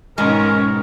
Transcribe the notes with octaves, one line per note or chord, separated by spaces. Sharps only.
G#2 B2 D#3 G#3 C#4 A#4